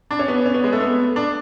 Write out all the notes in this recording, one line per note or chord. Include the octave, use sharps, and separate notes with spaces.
D4
C#4
B3
C#4
B3
G#3
A3
B3
D4